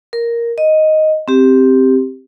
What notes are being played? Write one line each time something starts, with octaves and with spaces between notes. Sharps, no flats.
A#4
D#5
C4 G4